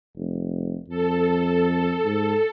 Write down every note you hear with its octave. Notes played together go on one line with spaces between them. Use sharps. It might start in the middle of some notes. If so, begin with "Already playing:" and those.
F1
F2 A4
G#2